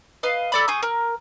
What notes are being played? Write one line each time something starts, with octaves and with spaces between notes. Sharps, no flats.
B4 D#5 F5
A4 D5 B5
G#4 C#6 D#6 G6
A#4